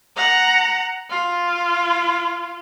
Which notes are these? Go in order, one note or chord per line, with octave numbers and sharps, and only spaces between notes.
F#5 A#5
F4